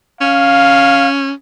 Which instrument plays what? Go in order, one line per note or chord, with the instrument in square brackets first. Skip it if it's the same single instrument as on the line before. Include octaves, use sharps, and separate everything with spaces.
[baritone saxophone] C#4 [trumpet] F5